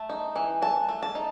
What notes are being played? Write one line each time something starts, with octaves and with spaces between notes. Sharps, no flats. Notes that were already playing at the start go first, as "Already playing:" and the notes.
Already playing: A3 A5
D#4
E3
E3 A5
A3
A5
D#4